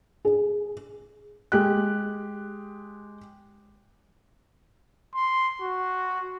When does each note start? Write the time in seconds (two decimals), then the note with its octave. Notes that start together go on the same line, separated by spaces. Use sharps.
0.25 G#4
1.52 G#3 G4 F#6
5.14 C6
5.61 F#4